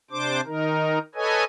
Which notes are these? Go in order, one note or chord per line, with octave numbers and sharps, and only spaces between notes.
C3 D4 C5 D6
D#3 D#4 A#4
A4 B4 C#5 D#5 G#5